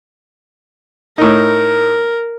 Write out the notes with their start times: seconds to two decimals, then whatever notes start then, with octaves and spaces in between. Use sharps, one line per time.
1.18 A2 D#4 A#4